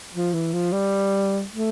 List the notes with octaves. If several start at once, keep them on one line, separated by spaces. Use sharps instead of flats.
F3
E3
F3
G3
A3